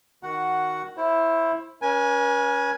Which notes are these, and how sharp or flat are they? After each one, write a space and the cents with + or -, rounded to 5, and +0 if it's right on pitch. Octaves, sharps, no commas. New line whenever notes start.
D#3 +0 F#4 +5 F#5 +0
E4 +0 C5 +25
C#4 +20 B4 -40 G#5 +0